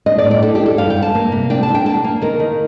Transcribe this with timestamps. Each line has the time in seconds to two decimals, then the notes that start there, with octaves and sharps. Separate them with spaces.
0.06 D4 D#5
0.18 D5
0.24 A2
0.31 D5
0.42 D4 A4
0.55 D4 G4
0.66 A4
0.78 G2 F5
0.90 G5
0.97 G2
1.02 A5
1.15 A#3
1.32 C3
1.50 D4 G5
1.63 A5
1.68 D4
1.75 G5
1.86 A#3 A5
2.04 A#3
2.22 D#3 A#4
2.40 D#3